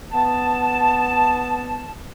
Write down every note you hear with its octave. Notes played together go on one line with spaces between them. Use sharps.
B3 A5